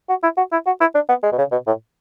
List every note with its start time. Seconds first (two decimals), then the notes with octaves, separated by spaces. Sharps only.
0.09 F#4
0.23 E4
0.37 F#4
0.52 E4
0.66 F#4
0.81 E4
0.95 D4
1.09 B3
1.23 G#3
1.32 B2
1.38 C#3
1.52 B2
1.67 A2